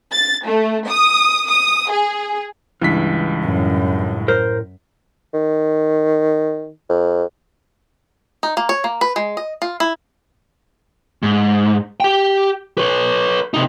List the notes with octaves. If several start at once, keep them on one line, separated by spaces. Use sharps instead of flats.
A6
A3
D#6
D#6
G#4
C#2 G2 E3 B6
F#2 A2
A#4 C5
D#3
F2
D#4
A#3
C#5
A#3
B4
G#3
D#5
F4
E4
G#2
G4 G5
B4 C#5
C3 D#4